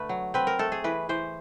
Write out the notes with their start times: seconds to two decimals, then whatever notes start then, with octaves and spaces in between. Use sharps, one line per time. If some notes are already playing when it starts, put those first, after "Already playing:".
Already playing: D3 A3 B4
0.09 F#3
0.34 C4 B4
0.47 A#4
0.59 A3 A4
0.72 G#4
0.84 E3 B4
1.09 E3 C5